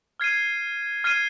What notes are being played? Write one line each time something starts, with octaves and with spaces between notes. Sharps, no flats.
F6 G#6 C7 D#7
F6 G#6 C7 D#7